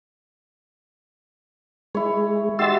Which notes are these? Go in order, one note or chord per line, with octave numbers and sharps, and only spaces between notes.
G#3 E4 C#5
F#4 G4 E5 C6 E6 A6